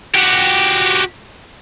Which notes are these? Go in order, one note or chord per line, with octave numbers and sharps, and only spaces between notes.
F#4 G4